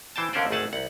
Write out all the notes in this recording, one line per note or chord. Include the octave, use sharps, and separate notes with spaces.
E3 C5 G5 A5
D#2 D3 C#4 A#4 C5 D5
G#1 D2 A3 G#4 F#5 A5
C2 F#5